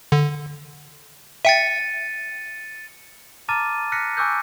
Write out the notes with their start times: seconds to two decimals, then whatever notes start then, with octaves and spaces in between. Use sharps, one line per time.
0.12 D3
1.45 E5 G5 A6 C#7 D#7
3.48 A5 A#5 D6 F6 A6 D#7
3.92 F6 F#6 A#6 B6 C#7
4.17 G#5 C#6 D6 E6 F#6 G6